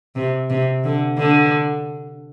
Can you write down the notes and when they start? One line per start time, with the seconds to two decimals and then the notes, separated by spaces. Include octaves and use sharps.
0.16 C3
0.50 C3
0.84 D3
1.18 D3